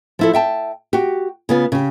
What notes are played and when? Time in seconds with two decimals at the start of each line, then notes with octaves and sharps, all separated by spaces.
0.19 F3 E4 A4
0.33 E5 G5 A5
0.93 F#4 G4
1.49 C#3 B3 F4
1.72 C#3 G4